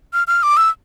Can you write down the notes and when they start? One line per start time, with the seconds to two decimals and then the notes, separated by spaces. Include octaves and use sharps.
0.13 F6
0.28 F6
0.43 D6
0.57 E6